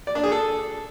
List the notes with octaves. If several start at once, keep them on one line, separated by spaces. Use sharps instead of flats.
D5
D4
G#4
A4